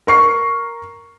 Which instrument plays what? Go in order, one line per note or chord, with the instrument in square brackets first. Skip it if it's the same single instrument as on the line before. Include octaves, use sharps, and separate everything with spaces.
[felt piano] A#4 C#6 C7